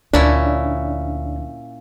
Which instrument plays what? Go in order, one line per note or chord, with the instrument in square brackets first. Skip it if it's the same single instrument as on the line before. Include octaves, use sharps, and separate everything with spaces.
[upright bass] D2 [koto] A#2 C#4 E4 [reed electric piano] D4